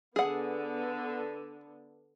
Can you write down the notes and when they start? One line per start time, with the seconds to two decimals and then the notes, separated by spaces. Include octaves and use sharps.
0.16 D3 B3 G#4 F#5